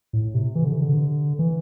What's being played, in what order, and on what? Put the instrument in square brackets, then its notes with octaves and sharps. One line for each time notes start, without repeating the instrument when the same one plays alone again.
[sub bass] A2
C3
E3
D3
C3
D3
E3